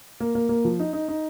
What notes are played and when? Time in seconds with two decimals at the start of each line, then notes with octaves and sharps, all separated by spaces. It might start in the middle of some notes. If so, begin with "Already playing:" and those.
0.20 A#3
0.35 A#3
0.49 A#3
0.65 F3
0.79 D#4
0.93 D#4
1.08 D#4